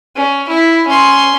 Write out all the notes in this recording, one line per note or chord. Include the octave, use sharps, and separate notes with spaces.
C#4
E4
C#4 C6